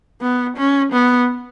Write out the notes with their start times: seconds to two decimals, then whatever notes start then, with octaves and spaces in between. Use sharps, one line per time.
0.21 B3
0.57 C#4
0.92 B3